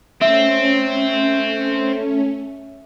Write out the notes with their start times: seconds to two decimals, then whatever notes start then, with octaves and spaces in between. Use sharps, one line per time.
0.21 A3 C4 C#4 E5